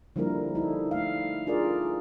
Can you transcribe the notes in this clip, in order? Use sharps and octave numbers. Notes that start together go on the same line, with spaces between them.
D3 F3 G3 A#3 E4 A#4
D#4 E4 A4
A3 F5
D4 F4 G#4 A#4 D5